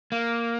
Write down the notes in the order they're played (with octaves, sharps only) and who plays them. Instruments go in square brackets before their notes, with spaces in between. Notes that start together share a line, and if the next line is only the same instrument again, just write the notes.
[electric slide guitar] A#3